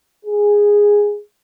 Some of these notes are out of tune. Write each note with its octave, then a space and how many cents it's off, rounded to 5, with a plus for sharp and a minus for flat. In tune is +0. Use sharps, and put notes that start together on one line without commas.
G#4 -10